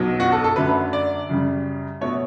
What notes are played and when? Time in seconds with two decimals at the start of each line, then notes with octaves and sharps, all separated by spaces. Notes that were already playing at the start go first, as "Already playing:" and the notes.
Already playing: B1 B2 F#3
0.20 F#4
0.32 A4
0.44 A4
0.56 F#2 D3 F#3 A3 B4
0.93 D5
1.29 F#2 C#3 G3
2.01 B2 A3 C#5